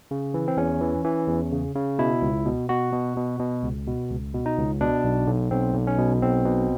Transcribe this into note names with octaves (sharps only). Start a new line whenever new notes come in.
C#3
E3
C4
E2 C#4
E3
E3
E2
C#3
C#3
B2 E4
C#2
B2
B2 F#4
B2
B2
B2
C#2
B2
C#2
B2
D#4
C#2
B2 D4
B1
B1
B1 C4
B1
C#4
B2
B1 C4
B2